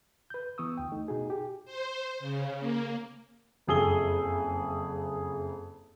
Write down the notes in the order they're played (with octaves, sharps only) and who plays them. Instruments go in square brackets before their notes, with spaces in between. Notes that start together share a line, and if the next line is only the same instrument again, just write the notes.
[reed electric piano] B4 G6
E3 B3 C#6 D#6 E6
D2 G5
A3 D#4
B2 D#4 F#4 G#4
G4 G#4
[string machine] C5
C#3
A#3
[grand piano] F#1 F2 G#4 D#6 E6 G7